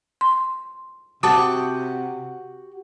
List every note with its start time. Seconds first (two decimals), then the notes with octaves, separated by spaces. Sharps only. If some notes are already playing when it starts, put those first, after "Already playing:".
0.21 C6
1.23 C3 F#4 G4 F#5 A5 D6 D#6